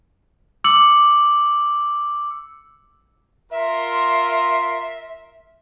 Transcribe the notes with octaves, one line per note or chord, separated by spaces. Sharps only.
D6 E6 C#7 F#7
F4 A#4 E5 C6